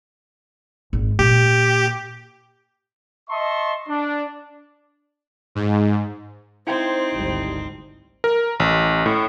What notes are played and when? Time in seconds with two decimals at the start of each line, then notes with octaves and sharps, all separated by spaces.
0.93 G#1
1.19 A#2 G4
3.30 D#5 E5 A5 C6 C#6
3.88 D4
5.55 G#2
6.67 C4 D#4 E4 C5 G5 G#6
7.14 G#1 D2 G3
8.24 A#4
8.60 A1
9.06 A2